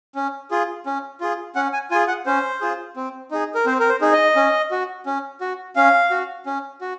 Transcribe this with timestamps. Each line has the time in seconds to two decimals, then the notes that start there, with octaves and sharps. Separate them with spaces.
0.15 C#4
0.51 F4 G#4
0.86 C#4
1.21 F4 G#4
1.55 C#4 F#5
1.73 G#5
1.91 F4 G#5
1.95 G#4
2.08 F#5
2.26 C#4 C5
2.61 F4 G#4
2.96 C4
3.31 D#4 G#4
3.55 A#4
3.66 C4 C5
3.80 A#4
3.89 C5
4.01 D#4 G#4
4.13 D#5
4.36 C#4
4.71 F#4
5.06 C#4
5.41 F#4
5.76 C#4 F5
6.11 F#4
6.46 C#4
6.81 F#4